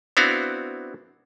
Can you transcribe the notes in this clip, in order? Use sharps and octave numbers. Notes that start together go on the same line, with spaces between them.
B3 C4 D4 E4 F#4 F5